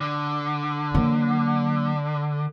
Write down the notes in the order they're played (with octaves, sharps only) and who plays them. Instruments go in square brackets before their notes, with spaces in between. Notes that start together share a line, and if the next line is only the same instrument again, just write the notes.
[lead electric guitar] D3
[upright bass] F#3 A#3